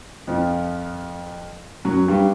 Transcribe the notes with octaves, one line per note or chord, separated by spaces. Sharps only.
F2 F3
F#2 F#3
G2 G3